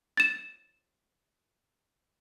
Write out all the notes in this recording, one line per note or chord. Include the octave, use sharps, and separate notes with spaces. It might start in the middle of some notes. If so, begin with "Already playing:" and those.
A6 E7